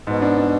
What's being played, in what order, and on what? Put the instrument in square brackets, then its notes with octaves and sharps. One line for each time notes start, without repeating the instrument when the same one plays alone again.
[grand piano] G#2 [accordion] B2
[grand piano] D4
D4